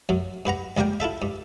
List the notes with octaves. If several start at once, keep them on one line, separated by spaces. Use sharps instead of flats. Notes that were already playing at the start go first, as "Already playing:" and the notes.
F#2 F#3
G2 B4 F#5 A#5
C#2 G3 A#3 A#4 G5
E4 F4 A4 E5
G2